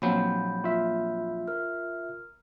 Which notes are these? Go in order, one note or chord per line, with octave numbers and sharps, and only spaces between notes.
A#1 F#3 C4 B5 G6
F4 E5
A#4 F6